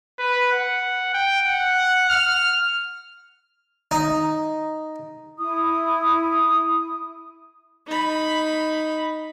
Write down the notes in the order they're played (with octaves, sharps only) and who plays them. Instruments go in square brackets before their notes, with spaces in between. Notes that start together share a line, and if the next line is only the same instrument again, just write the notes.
[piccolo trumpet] B4
F#5
G5
F#5
F6
[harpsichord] D#4
[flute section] E4 D#6
[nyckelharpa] D#4 B5